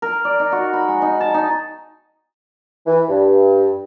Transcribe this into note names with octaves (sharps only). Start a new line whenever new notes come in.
A#4
D5
D#4
F#4
B5
G#3
D#4
A5
D#4
E3
G2